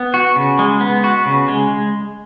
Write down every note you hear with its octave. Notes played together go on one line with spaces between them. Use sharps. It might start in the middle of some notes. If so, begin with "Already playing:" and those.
Already playing: B3
F#4
C#3
G#3
B3
F#4
C#3
G#3